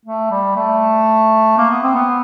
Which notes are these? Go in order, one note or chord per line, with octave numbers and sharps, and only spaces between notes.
A3
G3
A3
A#3
B3
C4
B3